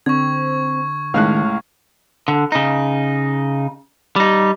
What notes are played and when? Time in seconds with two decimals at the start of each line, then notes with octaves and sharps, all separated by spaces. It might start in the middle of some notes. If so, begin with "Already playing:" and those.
0.06 D3 C4 C#6 G#6
1.14 C#2 A2 D#3 F5 F#6
2.28 D3
2.52 C#3 D#4
4.16 G3 D#4